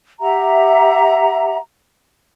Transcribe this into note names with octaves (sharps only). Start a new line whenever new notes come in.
G4 E5 F#5 A#5